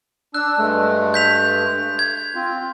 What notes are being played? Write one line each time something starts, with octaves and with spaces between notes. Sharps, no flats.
D4 E6 F#6
G2 G#3 A3
G6 B6 F7
G#6
C4 F4